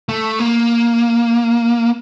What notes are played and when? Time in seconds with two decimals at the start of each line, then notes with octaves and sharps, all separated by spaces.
0.09 A3
0.39 A#3